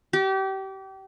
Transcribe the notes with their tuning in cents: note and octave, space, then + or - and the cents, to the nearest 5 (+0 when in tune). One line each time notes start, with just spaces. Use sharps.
G4 -30